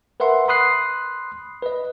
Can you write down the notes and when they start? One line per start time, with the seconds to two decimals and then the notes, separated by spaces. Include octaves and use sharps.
0.20 A#4 B4 E5 F#5 C6
0.48 B5 C6 D#6 F#6 C7
1.62 B4 D#5